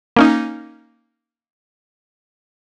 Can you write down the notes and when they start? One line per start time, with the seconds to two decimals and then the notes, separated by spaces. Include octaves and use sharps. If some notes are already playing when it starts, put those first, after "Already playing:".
0.17 A#3 C#4 D#4